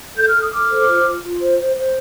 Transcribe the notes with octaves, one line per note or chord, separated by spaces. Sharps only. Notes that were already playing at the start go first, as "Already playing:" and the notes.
A4 G6
F6
A4
D#6
A4 D6 F6
C5
F4
F4
F4
C5
C5
C5